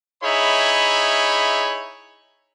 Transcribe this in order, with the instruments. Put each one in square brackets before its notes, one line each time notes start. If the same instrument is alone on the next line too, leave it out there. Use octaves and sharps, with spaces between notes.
[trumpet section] D#4 E4 G#4 C#5 E5 B5